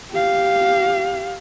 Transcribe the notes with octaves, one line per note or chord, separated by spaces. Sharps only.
G4 F5